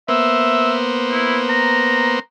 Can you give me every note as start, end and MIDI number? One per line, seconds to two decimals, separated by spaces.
0.08 2.19 58
0.08 2.19 59
0.08 2.19 72
0.08 0.74 76
1.11 1.39 64
1.49 2.19 82